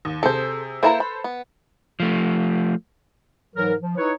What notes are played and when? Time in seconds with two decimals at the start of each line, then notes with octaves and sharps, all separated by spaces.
0.05 D#2
0.23 C3 G#4 A4 C5 G6
0.83 A#3 E4 A4 B4 C5 A#5
1.00 B5
1.24 B3
2.00 F3 A3
3.56 G#2 E3 F#3 A#4
3.82 F3
3.98 D#4 E4 B4 C#5